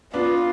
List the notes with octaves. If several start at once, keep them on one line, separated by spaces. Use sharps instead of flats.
B3 D4 F4